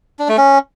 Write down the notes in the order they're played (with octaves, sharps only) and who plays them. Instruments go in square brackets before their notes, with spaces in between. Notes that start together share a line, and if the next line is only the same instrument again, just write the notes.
[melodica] D4
A3
C#4